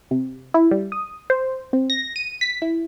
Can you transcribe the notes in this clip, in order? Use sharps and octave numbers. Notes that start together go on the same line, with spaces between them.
C3
E4
G3
D#6
C5
C4
A#6
D#7
B6
E4